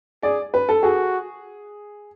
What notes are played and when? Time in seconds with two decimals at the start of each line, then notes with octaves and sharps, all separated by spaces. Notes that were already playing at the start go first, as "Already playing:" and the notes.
0.23 G#4 D5
0.54 B4
0.69 A4
0.83 F#4 G#4